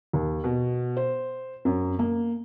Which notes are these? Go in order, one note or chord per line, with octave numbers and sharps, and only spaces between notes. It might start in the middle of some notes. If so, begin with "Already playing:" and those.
D#2
B2
C5
F#2
A#3